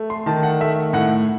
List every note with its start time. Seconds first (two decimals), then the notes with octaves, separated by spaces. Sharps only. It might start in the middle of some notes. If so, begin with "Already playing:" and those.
Already playing: A3
0.10 C6
0.26 D#3 A5
0.43 F#5
0.61 A3 E5
0.93 A2 F#5